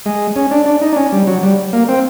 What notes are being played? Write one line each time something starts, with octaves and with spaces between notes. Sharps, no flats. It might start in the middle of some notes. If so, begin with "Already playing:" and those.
G#3
C#4
D4
D4
D#4
D4
C#4
G3
F#3
G3
A#3
C4